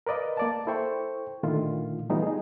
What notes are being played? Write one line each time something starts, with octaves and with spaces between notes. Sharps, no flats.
A#4 B4 D5 D#5 F5
A#3 D5 A5
E4 A4 C5 G5 C#6
A#2 D3 D#3 A3 E4 F4
E3 G3 A3 B3 D#4 F4
D#4 G#4